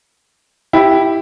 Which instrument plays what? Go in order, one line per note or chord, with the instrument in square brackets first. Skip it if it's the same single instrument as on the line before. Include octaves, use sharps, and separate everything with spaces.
[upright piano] E4 G4